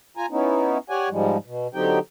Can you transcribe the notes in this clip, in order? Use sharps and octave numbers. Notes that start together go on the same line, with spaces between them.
F4 G#5 A#5
B3 C#4 D#4 E4
G4 C#5 D5 F#5 G#5
G#2 F3 G3 G#3
B2
D3 F#3 C4 D#4 G4 G5